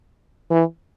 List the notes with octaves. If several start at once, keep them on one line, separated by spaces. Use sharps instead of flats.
E3